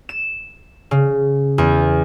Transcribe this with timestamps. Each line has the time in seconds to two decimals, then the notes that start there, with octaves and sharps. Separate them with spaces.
0.09 E7
0.91 C#3
1.58 E2